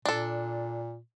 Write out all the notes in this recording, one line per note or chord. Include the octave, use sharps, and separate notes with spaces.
A#2 D4 A4